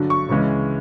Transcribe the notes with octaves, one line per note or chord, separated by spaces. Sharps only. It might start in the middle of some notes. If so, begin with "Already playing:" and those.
Already playing: G2 D3 F#3
C#6
C#2 C#3 E3 G#3 C#4